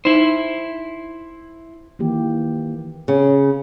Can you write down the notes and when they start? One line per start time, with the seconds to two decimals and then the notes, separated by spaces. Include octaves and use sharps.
0.05 D#4 E4 C5
1.99 D#3 E3 A#3 G4
3.08 C#3